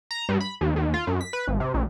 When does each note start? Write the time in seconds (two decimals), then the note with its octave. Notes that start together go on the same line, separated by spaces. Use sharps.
0.11 A#5
0.29 G2
0.40 B5
0.61 D#2
0.76 D#2
0.94 F4
1.07 F#2
1.21 B6
1.33 B4
1.47 G#1
1.60 C3
1.74 A#1